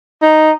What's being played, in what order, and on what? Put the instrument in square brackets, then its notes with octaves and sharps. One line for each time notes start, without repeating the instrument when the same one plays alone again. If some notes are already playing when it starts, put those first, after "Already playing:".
[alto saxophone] D#4